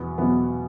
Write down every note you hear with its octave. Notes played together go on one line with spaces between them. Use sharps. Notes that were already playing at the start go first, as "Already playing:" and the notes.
Already playing: E2 B2 B3
E2 B2 B3